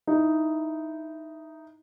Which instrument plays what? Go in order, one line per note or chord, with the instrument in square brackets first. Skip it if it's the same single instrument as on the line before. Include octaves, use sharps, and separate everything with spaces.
[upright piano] D#4 E4